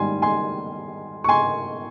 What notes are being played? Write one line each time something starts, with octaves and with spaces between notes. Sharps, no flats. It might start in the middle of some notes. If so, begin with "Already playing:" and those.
Already playing: G#2 D#3 G3 G#5 C6
G#5 C6
C#6
G#5 C6